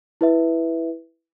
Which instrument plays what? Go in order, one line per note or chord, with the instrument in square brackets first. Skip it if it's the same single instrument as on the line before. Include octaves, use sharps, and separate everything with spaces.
[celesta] E4 B4 E5